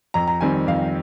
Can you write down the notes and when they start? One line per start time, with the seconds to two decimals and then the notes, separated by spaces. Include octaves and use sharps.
0.14 F2 A#5
0.28 A#5
0.41 D#3 G3 C4 G#5
0.67 F2 F5